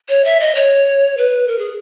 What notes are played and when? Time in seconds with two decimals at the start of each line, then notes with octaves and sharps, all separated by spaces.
0.09 C#5
0.25 E5
0.40 D#5
0.55 C#5
1.18 B4
1.48 A#4
1.59 G#4